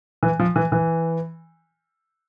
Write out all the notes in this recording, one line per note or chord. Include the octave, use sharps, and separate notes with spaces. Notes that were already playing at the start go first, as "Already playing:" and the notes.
E3
F3
E3
E3